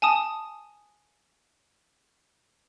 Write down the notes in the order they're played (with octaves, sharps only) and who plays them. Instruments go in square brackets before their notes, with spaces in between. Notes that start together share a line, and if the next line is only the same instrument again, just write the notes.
[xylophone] G#5 A5 D#6